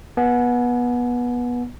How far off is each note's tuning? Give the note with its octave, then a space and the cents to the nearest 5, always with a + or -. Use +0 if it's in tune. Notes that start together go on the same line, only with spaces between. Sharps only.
B3 -20 G#5 +35